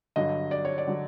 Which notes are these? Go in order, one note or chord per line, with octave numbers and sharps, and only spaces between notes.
G2 D3 F#3 D#5
D5
C#5
D5
D3 F#3